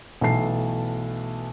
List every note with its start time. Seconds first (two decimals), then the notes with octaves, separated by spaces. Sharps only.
0.21 B1 E3 A3 A5 C7